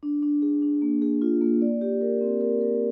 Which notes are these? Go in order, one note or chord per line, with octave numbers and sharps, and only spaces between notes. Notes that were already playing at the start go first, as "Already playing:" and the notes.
D4
D4
G#4
D4
A#3
G#4
F4
A#3
D5
G4
A#4
C4
A#4
A#4